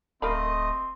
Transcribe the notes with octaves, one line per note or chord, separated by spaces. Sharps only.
D1 A3 C4 A#4 D#5 F5 B5 D#6